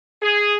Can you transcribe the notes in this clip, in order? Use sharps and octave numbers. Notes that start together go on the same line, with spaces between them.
G#4